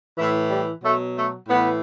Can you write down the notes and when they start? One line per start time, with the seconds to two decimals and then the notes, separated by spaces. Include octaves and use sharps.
0.17 A2 E3 E4
0.51 G3
0.84 B2 F#3 A3
1.16 A3
1.48 A2 E3 B3